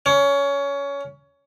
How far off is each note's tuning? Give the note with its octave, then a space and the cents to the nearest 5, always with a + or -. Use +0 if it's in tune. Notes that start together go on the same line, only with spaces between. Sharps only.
C#4 +20